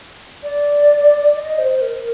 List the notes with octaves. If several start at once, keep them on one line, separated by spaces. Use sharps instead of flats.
D5
D#5
C5
A#4